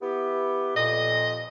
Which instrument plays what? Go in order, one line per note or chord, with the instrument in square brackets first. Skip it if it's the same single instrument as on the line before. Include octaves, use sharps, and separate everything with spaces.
[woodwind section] B3 E4 G4
[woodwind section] F2 A#2 [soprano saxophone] D#5